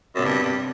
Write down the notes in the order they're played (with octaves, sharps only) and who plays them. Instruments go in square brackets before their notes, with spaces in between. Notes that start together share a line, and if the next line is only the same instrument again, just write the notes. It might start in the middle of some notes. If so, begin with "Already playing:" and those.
[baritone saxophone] F#2 [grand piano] B2
[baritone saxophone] G2 [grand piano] C3
[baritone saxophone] G2